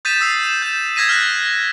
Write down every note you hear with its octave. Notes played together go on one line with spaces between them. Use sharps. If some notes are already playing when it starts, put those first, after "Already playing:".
D#6 G6 A6 B6 D#7 E7
D#6 E6 A6 C7
E7
G6 E7
E6 G#6 A#6 B6 D#7
F6 F#6 A#6